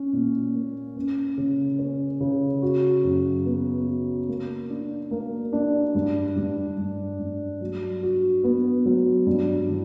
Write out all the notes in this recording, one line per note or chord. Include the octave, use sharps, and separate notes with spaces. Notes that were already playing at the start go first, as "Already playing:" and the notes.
Already playing: C#4
A#2
A#3
C#4
C#3
C#4
C#3
F#4
F#2
B3
F#4
A#3
D4
A#3
D4
G2
G2
G2
G2
F#3
F#4
B3
F#3
G2
E3